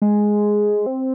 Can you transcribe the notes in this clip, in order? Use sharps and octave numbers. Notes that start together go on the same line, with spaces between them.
G#3
C4